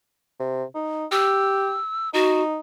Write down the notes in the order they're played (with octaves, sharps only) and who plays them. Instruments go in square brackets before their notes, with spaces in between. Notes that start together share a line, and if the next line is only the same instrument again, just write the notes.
[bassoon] C3
D#4
[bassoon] G4 [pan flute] E6
[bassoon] D#4 [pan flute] F#4